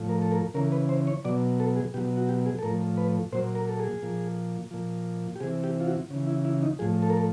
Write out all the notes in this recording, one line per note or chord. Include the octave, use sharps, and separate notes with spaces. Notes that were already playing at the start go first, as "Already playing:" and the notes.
Already playing: A2 F3
A#4
A4
A#4
C#3 E3 A#4
B4
C5
C#5
B2 F#3 D5
A4
G#4
B2 F#3 G4
F#4
G4
G#4
A4
A2 F3 A#4
B4
A#2 F#3 C5
A#4
A4
G#4
A#2 F3
A#2 F3
G4
C3 E3 G#4
G4
F4
F#4
C#3 E3
E4
E4
D#4
A2 F3 G#4
A4
A#4
A4